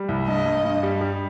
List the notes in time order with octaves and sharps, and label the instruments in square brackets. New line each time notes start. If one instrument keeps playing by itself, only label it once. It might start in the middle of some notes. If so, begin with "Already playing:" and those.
Already playing: [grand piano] G3
C2
[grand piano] G2 [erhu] D#5
[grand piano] G2
G2
G3
G3